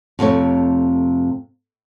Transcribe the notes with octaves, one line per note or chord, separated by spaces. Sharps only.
F2 C3 A3 C#5